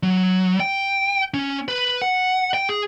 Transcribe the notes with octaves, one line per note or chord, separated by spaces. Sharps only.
F#3
G5
C#4
B4
F#5
G5
G#4